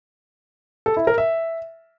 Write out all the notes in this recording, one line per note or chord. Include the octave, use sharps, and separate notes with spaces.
A4
E4
A#4
E5